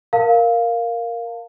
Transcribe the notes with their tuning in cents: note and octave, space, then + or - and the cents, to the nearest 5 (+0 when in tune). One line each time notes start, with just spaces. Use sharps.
A#4 +0 F5 +0 A5 +35